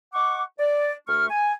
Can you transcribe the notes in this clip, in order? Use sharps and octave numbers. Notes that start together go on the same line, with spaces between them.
D#5 F#5 C#6 D6
D5
D2 A3 C#6 F6
G#5